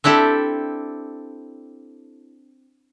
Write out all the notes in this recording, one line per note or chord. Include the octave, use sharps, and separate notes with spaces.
C4 D4 E4 G4 A4